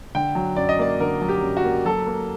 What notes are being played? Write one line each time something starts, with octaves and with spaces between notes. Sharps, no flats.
D3 G5
F#3
F#2 D5
D#5
A#3 D5
D3 A#4
F#3
G4
F#2
F#4
A#3
F#3 A4
A#3